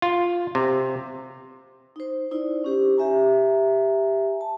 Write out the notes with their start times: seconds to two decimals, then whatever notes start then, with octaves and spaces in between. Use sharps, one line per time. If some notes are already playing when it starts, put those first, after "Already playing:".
0.02 F4
0.55 C3
1.96 D#4 C5
2.31 D#4 E4 C5 D5
2.64 C#4 G4 C5
2.97 G4 E5 G#5 A#5
4.41 A5